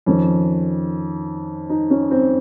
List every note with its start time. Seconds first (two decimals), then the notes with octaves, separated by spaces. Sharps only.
0.06 F2 D#3 C#4
1.69 D#4
1.90 C#4
2.11 C4